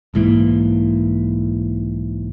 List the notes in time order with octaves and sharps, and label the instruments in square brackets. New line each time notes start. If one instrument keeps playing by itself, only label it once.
[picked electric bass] B1 G#2 E3 A#3